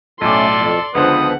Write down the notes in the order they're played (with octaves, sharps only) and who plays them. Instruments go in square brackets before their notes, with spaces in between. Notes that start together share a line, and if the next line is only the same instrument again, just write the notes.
[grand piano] B1 A2 D6 [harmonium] A3 C#4 [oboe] A4 [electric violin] D5 C6
[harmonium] F2
[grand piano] C#2 D3 C5 [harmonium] F3 B3 B4 [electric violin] F#5 [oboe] D#6